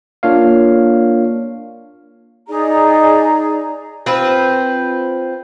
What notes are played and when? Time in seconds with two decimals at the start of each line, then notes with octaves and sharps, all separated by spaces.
0.23 A#3 D4 F4 C#5 F5
2.48 D#4 G#4 D5 A#5
4.06 C4 F4 B4